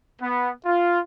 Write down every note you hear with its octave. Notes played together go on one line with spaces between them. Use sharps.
B3
F4